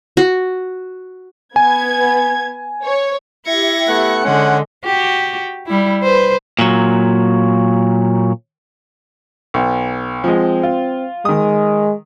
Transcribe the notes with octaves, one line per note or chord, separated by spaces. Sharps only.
F#4
B3 G#5 G#6
C#5
E4 G4 E5 G#6 A#6 C#7
A3 B3 F#6
D3 G#3 C#4 F#5
F#4 G4
G3 E4
B4 C5
A#2 F#3
B1
F3 G#3 C4
F4
D#3 G#3 D#6